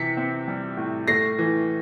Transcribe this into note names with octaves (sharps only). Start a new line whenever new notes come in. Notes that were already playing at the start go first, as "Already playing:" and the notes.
Already playing: C3 E3 B6 C#7
C4
G3
A2
A3 A#6 C7
E3